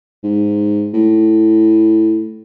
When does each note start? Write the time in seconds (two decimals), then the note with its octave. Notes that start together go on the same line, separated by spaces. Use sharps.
0.23 G#2
0.94 A2